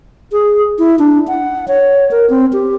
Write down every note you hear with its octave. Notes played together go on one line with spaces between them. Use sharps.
G#4
E4
D4
F#5
C#5
A#4
C4
G4